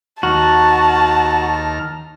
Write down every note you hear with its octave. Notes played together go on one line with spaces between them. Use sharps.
D#2 F#4 A5 A#5 F6